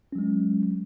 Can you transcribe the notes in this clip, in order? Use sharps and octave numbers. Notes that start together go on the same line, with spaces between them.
F#3 G#3 C#4